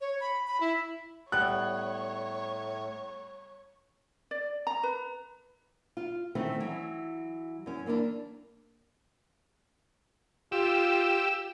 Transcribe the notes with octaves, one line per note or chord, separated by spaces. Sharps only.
C#5
B5
B5
E4
A2 G3 B3 C#5 F#6
D5
A#5
B4
F4
D#3 E3 A3 C4 C#4
E3 F#3
F#2 C#4
E3 A#3 C#4 D4
F4 G4 E6